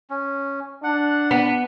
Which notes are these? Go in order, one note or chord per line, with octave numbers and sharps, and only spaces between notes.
C#4
D4 F#5
B3